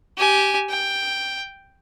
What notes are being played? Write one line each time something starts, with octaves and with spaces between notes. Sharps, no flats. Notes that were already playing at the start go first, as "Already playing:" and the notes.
G4 G#5
G5